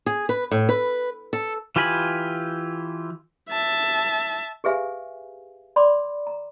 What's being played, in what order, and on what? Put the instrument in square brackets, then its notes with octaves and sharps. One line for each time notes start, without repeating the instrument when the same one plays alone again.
[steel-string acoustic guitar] G#4
B4
A2
B4
A4
[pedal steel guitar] E3 F4 G4 G#5 B5
[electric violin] E5 A5
[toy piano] G4 G#4 B4 E5 F5 G#5
D5 B5 C6 D6
A#5